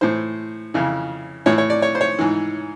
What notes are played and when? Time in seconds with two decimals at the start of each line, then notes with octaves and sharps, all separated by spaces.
0.01 A2 E3 C5
0.74 F2 C#3 E3
1.46 A2 E3 C#5
1.58 C#5
1.70 D5
1.82 C#5
1.95 C5
2.01 C#5
2.18 G#2 E3